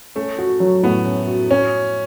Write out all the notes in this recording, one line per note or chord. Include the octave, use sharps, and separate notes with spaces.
A3 C#4
F#4
F#3
A2 B3
C#4
F#4
C#4 F#4